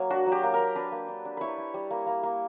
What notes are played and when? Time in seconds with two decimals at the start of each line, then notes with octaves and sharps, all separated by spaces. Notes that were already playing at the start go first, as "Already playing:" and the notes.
Already playing: F#3 A#3
0.10 D4 F#4
0.26 F#3
0.32 G4
0.43 A#3
0.54 A#4
0.59 A#3
0.76 D4 B4
0.92 A#3
1.08 D4
1.25 D4
1.37 E4 B4 C#5
1.58 E4
1.74 G3
1.91 A#3
2.07 A#3
2.23 A#3